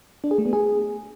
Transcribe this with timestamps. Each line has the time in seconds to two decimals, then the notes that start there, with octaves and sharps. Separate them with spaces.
0.24 D4
0.31 G#4
0.38 A3
0.46 B3
0.53 G#4